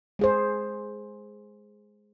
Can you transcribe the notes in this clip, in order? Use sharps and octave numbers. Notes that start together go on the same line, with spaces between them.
G#3 G#4 C5